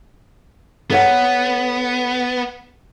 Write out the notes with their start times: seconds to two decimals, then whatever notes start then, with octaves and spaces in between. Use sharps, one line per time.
0.90 B3 A4 C#5 F#5